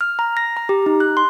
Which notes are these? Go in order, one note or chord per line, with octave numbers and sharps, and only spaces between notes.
F6
A#5
A#6
A#5
G4
D#4
F#6
C6